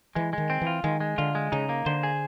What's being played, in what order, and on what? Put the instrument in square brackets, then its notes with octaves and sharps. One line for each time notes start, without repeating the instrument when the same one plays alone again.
[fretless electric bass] E3 [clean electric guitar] G#3
[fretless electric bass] D#3 [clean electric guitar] G#3
[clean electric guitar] C4
[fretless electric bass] E3
[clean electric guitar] F4
[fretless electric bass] D#3 [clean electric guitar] G#3
[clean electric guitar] G#3
[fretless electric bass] D3 [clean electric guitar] F4
[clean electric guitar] G#3
[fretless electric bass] C#3 [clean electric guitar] D#4
[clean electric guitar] A#3
[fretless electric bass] D3 [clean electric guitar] C5
[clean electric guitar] G#4